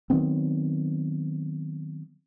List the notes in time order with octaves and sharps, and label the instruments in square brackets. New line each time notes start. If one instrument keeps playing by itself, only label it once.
[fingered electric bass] D#3 F#3 B3 C4